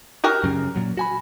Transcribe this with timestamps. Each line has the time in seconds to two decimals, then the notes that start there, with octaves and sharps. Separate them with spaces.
0.24 F#4 G4 A#4
0.44 F#2 C#3
0.76 A#2 F#3
0.97 F#4 G#5 B5